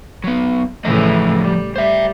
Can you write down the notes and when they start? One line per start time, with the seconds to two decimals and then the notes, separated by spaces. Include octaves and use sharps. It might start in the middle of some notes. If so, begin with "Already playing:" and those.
0.24 F#3 B3
0.85 A2 C#3 E3 F3 A3 D#5
1.41 G3
1.76 G3 C5 E5